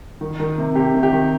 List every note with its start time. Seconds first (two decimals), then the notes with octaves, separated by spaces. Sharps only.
0.21 D#3
0.40 D#3
0.58 C3
0.75 C3 G4
0.94 D#3
1.03 G4
1.12 D#3